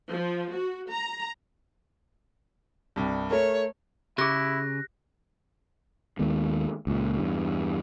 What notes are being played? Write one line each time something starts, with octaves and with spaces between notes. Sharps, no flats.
F3
F#4
A#5
C2 G2
A3 A#4 C#5
C#3 E4 G4 G#4 F#6 A#6
D#2 D#3 G#3 B3
C#2 A#2
E2 G2